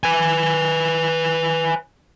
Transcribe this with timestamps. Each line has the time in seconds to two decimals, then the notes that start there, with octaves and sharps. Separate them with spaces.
0.04 B4 G#5